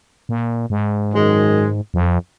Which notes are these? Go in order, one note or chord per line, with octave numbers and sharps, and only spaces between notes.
A#2
G#2
F#2 D#3 G#3
F2